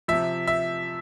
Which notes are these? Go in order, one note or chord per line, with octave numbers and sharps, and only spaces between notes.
C3 F3 E5
E5